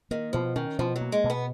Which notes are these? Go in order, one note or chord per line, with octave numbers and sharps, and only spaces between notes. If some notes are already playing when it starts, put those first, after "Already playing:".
D#3 A#3
B2 F3
D#3 C#4
B2 F3
F#3
A#3
G#3
B2
B3